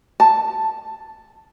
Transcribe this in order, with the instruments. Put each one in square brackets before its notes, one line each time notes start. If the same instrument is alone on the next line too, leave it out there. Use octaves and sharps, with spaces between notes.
[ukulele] A5